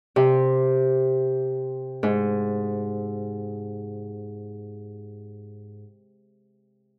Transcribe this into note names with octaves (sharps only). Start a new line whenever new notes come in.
C3
G#2